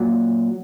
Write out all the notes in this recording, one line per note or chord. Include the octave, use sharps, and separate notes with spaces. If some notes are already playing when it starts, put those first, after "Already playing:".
Already playing: A#2 F#3